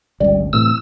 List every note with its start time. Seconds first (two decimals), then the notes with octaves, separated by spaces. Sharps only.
0.21 G1 C#2 G3
0.53 A2 C3 E3 E6